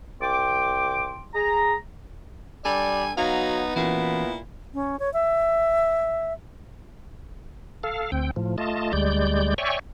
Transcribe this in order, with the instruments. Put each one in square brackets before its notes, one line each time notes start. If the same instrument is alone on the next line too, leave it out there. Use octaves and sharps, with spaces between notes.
[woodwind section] C2 G5 C6 D6
G#4 A#5
[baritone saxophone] G3 [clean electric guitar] D4 A4 [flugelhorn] D5 [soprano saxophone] G#5
[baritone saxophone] F#3 [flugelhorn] B3 [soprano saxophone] D#4 [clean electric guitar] F5
[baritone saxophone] A#2 [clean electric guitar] E3 C#4 F#4 [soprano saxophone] E4
[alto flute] C#4
C#5
E5
[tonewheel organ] A4 F5
D2 C4 G5
A2 F3
A3 F4 D#5 A5
D2 G3 G#3 D5 G6
C#5 D5 E5 G5 G#5 C#6